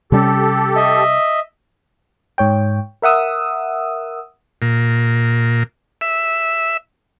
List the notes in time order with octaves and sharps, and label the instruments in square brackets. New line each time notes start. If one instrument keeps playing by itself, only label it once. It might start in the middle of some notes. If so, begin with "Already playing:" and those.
[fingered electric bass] C3 G3 C#4 [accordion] G4 A4
[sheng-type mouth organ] D#5 E5
[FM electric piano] G#2 C#5 G5
A#4 E5 F#5 D#6 E6
[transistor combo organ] A#2
E5